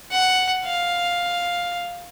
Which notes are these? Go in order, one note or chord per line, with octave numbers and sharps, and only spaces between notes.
F#5
F5